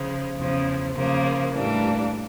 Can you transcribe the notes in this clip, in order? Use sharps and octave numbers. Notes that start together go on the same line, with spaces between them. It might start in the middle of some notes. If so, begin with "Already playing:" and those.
Already playing: C#3 F3
E2 C#3 F3
C#3 F3 A#3
A2 E3 G3 A#3 D4